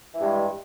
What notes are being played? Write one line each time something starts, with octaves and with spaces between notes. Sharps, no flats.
G2 E3 G#3